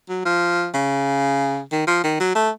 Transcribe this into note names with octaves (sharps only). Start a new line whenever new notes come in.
F#3
F3
C#3
D#3
F3
D#3
F#3
A3